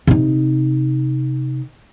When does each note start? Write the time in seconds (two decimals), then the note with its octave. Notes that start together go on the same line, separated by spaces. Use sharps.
0.07 C3 D#4